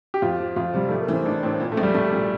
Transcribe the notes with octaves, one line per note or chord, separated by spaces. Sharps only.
G4
F2 F4
F3
F2 F4
C3 G3
A1 A3
A#3
E3 C4
A1 D4
A2 C4
A#2
A3
A#1
G3
A#1 A3
A#2